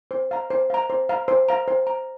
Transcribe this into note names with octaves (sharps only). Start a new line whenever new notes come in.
C5
F5 A#5
C5
F5 A#5
C5
F5 A#5
C5
F5 A#5
C5
A#5